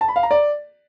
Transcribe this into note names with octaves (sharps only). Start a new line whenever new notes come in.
A5
B5
F5
A#5
D5